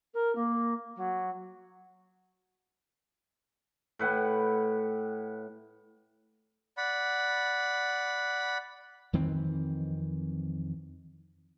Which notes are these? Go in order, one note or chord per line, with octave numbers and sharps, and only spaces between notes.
A#4
A#3
F#3
A2 B4 F#5 G5
D5 F#5 B5
F2 D#3 E3 C4